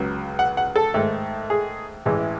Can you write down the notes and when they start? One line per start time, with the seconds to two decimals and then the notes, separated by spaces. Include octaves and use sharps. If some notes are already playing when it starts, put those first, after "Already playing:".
Already playing: C#2 C#3 F#3
0.39 F#5
0.57 F#5
0.76 A4
0.94 G#2 D#3 A3
1.50 G#4
2.06 A1 A2 E3 G#3